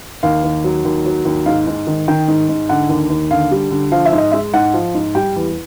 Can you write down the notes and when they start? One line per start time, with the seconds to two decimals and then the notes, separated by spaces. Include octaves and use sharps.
0.23 D#2 F5
0.44 D#2
0.64 F#3
0.85 D#2
1.06 F#3
1.25 D#2
1.46 G#2 F5
1.67 G#2
1.87 D#3
2.08 D#3 G5
2.28 G#2
2.49 G#2
2.69 D3 F#5
2.89 D#2
3.10 D#2
3.31 D3 F5
3.51 G3
3.71 D3
3.92 F3 F5
4.05 E5
4.12 G#2
4.18 D#5
4.32 G#3 E5
4.54 G#2 F#5
4.74 F3
4.95 G#2
5.15 G3 G5
5.36 E2